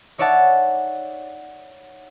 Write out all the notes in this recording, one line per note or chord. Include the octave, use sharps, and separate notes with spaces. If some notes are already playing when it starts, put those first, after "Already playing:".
D#4 C#5 D5 E5 F#5 A5